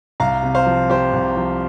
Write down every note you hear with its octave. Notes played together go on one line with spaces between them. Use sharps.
C2 F5 A#5
C3
C5 F5
F3
F3 G4 C5
C2
F3